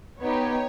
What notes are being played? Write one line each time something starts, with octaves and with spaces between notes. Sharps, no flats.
B3 D#4 G4 C#5